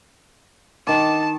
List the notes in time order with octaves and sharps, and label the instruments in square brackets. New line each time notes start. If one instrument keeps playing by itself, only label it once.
[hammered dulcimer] D#3 D6 [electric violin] A5